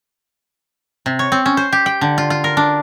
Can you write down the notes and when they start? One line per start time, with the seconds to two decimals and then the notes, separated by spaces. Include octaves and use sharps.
1.06 C3
1.19 C#5
1.32 C4
1.46 C#4
1.57 C5
1.73 G4
1.86 G5
2.01 D3
2.18 F4
2.30 F4
2.44 A#4
2.57 D4